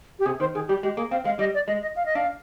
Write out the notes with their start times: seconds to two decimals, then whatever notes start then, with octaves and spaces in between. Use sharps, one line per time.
0.19 G4
0.26 C3 G#4
0.40 D#3 C5
0.55 D#3 G#4
0.68 G3 G4
0.83 G#3 G4
0.97 A#3 G#4
1.11 C4 F5
1.25 G#3 F5
1.39 G3 D#5
1.54 D5
1.67 G#3 D#5
1.82 D#5
1.96 F5
2.06 D#5
2.15 D4 F5